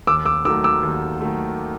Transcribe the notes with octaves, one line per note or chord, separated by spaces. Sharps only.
D#2 D6 E6
D6 E6
D#3 F#3 A3 D6 E6
D6 E6
D#2
D#3 F#3 A3